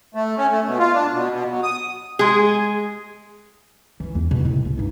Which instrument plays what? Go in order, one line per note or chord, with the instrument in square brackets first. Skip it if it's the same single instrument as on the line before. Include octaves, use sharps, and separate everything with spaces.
[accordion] A3
C#4
A3
B2
F4
D4
B2
B2
F#3
D#6
[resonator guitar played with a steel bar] G#3 G#4
[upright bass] E3 C#4
E2
B2
A2 C3
C2
G2 D#4